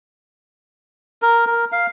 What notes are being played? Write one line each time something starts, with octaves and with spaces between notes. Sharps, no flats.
A#4
A#4
F5